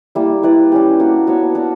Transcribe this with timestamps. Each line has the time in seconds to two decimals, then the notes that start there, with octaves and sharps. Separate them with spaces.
0.15 G3 A#3 E4
0.43 E4 B4 D5
0.72 G3 C#4 G4
1.00 A#3 D4 F#4
1.27 B3 D4 F#4 C#5
1.55 D4 F#4 A#4